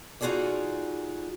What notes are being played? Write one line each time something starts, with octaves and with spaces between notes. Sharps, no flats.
D#4 F4 F#4 G#4 A4 D5